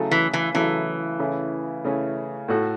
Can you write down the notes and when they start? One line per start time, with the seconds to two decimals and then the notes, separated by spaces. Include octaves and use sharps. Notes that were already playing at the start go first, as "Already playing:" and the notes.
Already playing: C#3 F#3 A3 E4 A4
0.11 E3
0.33 E3
0.54 C#3 E3 F#3 A3 E4 A4
1.19 C#3 A3 C#4 E4
1.85 C#3 A3 C#4 E4
2.48 A2 A3 F#4 A4